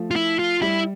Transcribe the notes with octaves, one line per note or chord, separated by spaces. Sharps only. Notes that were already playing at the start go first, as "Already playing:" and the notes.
Already playing: F3 A3
F4
E4
F4
G3 E4